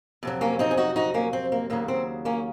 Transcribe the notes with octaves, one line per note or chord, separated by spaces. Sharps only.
F2 C3 F#3
A#3 C#4
C4 D#4
G#4
D#4 F#4
D#4 F#4
A#3 C#4
C4
A#3
D#2 C#3 F#3 A#3
C4
A#3 C#4